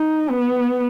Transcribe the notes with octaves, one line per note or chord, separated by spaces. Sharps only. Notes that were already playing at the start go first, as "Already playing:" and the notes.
Already playing: D#4
B3